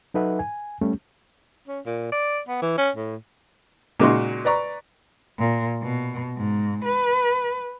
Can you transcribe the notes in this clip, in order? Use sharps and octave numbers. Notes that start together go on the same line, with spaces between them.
F#3 D#4 A4 B4 E5 F#5
G#5
G3 A3 C#4 G4
C#4
A#2
D5
B3
E3
C#4
A2
A#2 C#3 G#3 D#4 F#4 C6
B4 D5 A#5 C#6
A#2
B2
G#2
B4